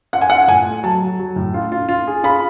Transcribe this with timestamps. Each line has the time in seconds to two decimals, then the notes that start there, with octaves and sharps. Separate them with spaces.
0.13 F4 F#5
0.21 G#5
0.30 F4 F#5
0.48 A2 G#5
0.66 A3
0.83 F#3 A5
1.02 F#3
1.19 F#3
1.36 A2
1.54 F4
1.72 F4
1.89 F4
2.07 G#4
2.24 F4 B5